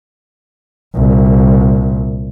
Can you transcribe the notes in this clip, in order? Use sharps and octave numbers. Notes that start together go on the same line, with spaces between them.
C2 A#2